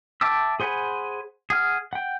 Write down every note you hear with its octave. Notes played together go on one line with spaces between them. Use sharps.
E5 G5 A5 D6 E6
G#4 C5 F#5 G#5 B5
G#4 F#5 F6
F#5 G5